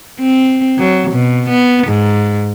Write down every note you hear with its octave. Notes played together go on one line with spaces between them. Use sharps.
C4
F#3
B2
B3
G#2